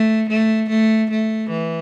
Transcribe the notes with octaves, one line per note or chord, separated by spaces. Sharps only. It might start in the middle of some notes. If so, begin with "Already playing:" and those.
Already playing: A3
A3
A3
A3
E3